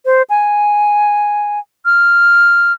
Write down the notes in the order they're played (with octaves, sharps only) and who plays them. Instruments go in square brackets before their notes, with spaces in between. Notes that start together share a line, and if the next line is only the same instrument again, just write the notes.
[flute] C5
G#5
F6